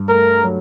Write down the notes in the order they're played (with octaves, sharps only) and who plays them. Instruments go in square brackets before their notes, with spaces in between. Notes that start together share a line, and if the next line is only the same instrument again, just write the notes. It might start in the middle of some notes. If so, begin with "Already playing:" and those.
Already playing: [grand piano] G2
[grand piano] A3 [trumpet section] A#4
[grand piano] F#3